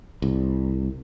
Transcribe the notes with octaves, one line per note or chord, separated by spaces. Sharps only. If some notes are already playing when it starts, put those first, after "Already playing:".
C2